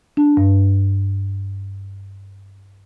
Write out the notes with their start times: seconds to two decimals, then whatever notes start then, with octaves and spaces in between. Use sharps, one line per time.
0.17 D4
0.37 G2